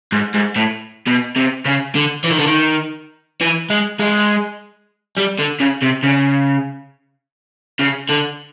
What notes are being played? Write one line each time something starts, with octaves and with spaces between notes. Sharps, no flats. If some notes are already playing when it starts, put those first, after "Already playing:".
G#2
G#2
A2
B2
C3
C#3
D3
E3
D#3
D3
D#3
E3
G#3
G#3
G3
D3
C#3
C3
C#3
C#3
D3